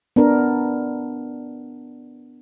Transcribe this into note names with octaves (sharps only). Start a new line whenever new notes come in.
B3 D4 A#4